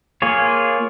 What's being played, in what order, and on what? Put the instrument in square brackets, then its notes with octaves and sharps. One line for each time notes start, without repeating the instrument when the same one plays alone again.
[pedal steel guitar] A#3 F4 G#4 C#5